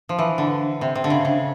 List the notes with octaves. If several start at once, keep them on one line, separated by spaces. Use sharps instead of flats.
F3
E3
D3
C3
C3
D3
C#3
C#3